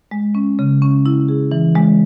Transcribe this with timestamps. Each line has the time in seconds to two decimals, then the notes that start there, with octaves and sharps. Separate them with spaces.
0.11 G#3
0.35 C#4
0.59 C#3
0.82 C#4
1.06 E4
1.28 G#4
1.52 E3
1.76 G#3